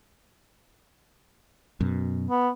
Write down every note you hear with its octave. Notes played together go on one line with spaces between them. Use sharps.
F#2 B2
B3